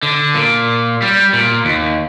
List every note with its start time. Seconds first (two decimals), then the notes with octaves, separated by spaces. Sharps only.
0.03 D3
0.34 A#2
1.02 G3
1.33 A#2
1.65 D#2